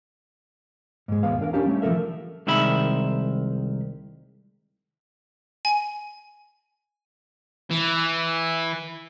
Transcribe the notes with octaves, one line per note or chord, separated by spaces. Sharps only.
G#2 G#3
E2 B2 G#3 B3 F5
E2 D4 A#4 F5
C#4 D4 G4 F5 A#5
G3 A3 C#4
E3 F3 A#3 A4 A#4 E5
C2 D#3 G#3 E5 B5
G#5
E3